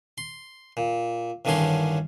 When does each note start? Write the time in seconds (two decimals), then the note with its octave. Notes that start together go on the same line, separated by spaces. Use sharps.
0.18 C6
0.77 A#2
1.45 A1 G2 D3 D#3 C#4 C6